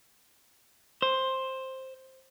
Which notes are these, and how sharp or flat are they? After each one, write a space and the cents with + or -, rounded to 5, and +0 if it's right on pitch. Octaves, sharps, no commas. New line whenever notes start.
C5 +10